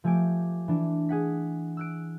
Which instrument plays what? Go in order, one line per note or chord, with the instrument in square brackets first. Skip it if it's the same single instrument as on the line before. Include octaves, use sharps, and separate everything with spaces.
[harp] F3 A3 G4 G#5 D6 D7
E3 D4
G#4 F#5 B6
E6 F#6 D7